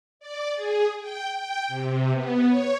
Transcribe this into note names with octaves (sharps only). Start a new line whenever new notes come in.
D5
G#4
G5
G5
C3
B3
C#5